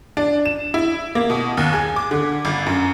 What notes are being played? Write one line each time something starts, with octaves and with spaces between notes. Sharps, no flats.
D4
E7
E4
A#3
B2
D#2
G#4
D6
D3
G1
F#2